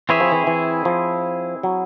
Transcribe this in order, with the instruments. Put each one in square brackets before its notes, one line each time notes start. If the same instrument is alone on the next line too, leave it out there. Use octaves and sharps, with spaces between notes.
[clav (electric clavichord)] E3 [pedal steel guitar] C4 E4 G#4 C#5 E5
[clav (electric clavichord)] F3
E3
E3
F3
F#3